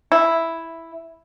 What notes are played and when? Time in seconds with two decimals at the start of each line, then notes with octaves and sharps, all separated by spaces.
0.12 E4